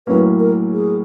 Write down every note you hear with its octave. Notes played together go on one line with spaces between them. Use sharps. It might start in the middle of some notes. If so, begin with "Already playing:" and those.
A2 F#3 A#3 C#4 B4
A#4
G#4